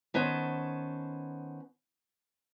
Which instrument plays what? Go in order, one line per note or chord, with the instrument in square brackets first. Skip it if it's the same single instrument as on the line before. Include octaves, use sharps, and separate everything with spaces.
[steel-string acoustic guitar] D#3 B3 C#4 C5 A5